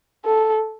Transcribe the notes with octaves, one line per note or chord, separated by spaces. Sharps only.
A4